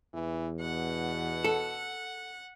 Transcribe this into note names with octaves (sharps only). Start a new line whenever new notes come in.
E2 E3
B2 F#5
A4